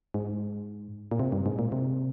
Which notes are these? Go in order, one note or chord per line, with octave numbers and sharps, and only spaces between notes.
G#2
A#2
C3
G2
G#2
A#2
C3